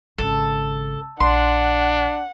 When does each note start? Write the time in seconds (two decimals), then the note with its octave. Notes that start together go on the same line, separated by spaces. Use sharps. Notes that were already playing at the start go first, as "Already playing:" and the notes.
0.18 G#1 C#3 A4
1.20 A#1 D4 F#5 C6